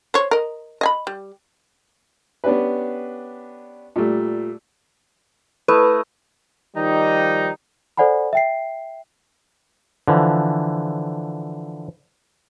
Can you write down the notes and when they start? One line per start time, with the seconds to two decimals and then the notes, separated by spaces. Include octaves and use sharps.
0.14 C5 C#5
0.31 A#4 D#5
0.81 D#5 G#5 B5
1.07 G3
2.44 B3 C#4 D4 G4 B4
3.96 A#2 G3 A3
5.68 A3 E4 B4 D#5
6.76 D#3 F3 G3 D#4
7.97 A4 C5 D5 F#5 G#5 B5
8.33 E5 G5 C7
10.08 D3 E3 F3